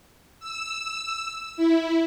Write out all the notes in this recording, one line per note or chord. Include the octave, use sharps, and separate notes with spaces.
E6
E4